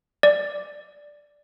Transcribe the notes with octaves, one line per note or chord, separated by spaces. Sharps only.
D5